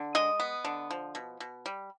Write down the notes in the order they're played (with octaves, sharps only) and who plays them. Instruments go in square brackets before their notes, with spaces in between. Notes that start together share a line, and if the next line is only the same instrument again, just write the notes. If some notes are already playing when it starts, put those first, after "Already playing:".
Already playing: [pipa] D3
G#3 D#5
B3
D3
F3
B2
B2
G3